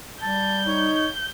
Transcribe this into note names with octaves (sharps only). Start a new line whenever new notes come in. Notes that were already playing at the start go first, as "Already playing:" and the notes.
G3 A5 G6
D#4 C#5